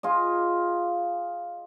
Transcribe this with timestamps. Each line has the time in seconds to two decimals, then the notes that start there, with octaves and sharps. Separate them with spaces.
0.03 F4 G#4 D#5